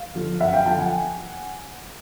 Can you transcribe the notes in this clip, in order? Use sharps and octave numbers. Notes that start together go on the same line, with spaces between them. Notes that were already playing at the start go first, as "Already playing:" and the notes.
Already playing: F5
D3 F3
F#2 E5 F#5
F5 G5
D3 F3 G5 A5
F#5 G#5